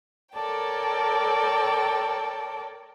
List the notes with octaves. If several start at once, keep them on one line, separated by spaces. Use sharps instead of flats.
A4 A#4 C#5 D5 G5 A5